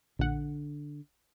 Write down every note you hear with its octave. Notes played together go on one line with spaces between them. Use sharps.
A#1 D3 F#5